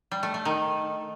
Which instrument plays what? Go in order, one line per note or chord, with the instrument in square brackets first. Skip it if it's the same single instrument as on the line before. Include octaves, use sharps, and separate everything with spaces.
[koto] G3
A3
A3
D#3